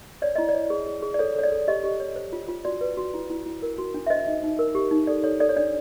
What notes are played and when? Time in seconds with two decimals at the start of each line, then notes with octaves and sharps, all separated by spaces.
0.22 C#5 D5
0.36 E4 D#5
0.49 D5
0.54 C#5
0.70 G#4
0.86 G#4
1.03 G#4
1.14 D5
1.19 A4 C#5
1.35 A4 C#5
1.43 D5
1.52 A4
1.68 G4 D#5
1.84 G4
2.00 C#5
2.16 C5
2.33 F4
2.49 F4
2.65 F#4 D5
2.81 B4
2.97 F#4
3.14 E4
3.30 E4
3.46 E4
3.62 A#4
3.78 F#4
3.94 D4
4.07 E5
4.10 C5 D#5
4.27 D#4
4.43 D#4
4.59 A#4
4.75 G4
4.91 D#4
5.07 A4 D5
5.24 A4 C#5
5.40 A4 D5
5.49 C#5
5.57 D4 D5